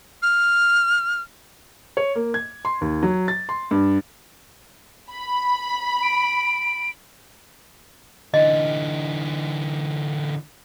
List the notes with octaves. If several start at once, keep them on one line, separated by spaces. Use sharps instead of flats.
F6
C#5
A#3
G#6
C6
D#2
F#3
A6
C6
G2
B5
D7
D3 E3 D#5